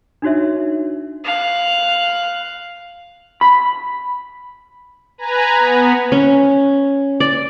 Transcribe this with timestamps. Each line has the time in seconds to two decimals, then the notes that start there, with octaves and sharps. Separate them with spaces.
0.22 D4 D#4 F#4 C#5 E5
1.24 F5 F#6
3.41 B5
5.18 B4 G#5 A#5
5.59 B3
6.12 C#4
7.20 D5